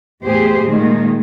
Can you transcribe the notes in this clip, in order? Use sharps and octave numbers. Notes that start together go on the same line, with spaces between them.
E2 A2 G4 G#4 C5
A#2 D#3 G#3 A3